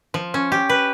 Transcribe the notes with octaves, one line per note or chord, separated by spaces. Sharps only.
F3
C#4
G4
B4